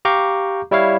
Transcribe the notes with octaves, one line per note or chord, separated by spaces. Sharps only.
G4 F5 A#5 C#6 D6 G6
G3 E4 C#5 F5